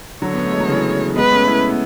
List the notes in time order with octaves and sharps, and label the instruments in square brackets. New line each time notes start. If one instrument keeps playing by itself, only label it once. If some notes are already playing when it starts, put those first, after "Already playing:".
[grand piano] D3 F#3 [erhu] C#5
[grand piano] B3
A3
G#3
F#3
C#3 E3
[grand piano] G#3 B3 [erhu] B4
[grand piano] A3 C#4
C#4 E4
B3